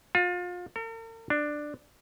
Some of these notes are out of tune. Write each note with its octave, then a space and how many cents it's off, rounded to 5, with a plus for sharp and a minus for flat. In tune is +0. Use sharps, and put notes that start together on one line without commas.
F4 +30
A#4 -45
D4 +10